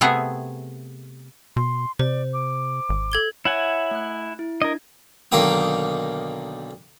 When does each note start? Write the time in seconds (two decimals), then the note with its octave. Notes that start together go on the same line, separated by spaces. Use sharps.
0.01 C3 A3 B3 G#4
1.56 B2 C6
1.99 C3 C5 D5
2.33 D6
2.89 G#1
3.12 A4 G#6 G7
3.45 E4 C#5 E5 F#5 G#5
3.91 A3 F#6
4.39 E4
4.62 D4 A#4 D#5 G#6
5.32 B1 D3 D#3 A#3 G5 D#6